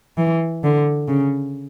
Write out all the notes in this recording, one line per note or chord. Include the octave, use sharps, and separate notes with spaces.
E3
D3
C#3